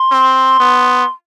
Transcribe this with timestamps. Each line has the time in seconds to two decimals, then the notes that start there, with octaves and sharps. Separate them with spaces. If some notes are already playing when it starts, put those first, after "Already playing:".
Already playing: C6
0.11 C4
0.60 B3